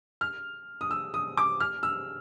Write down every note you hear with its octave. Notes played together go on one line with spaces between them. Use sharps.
F6
D#6
E6
D#6
D6
F6
E6